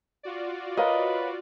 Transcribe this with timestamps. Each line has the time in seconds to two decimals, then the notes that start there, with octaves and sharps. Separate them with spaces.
0.23 F4 F#4 D5
0.77 A#4 B4 C#5 D#5 F5